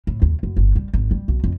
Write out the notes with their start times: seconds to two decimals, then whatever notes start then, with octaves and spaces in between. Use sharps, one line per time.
0.07 A2
0.22 D#2
0.43 F#2
0.57 G1
0.75 G3
0.94 G#1
1.11 G3
1.28 B1
1.44 F2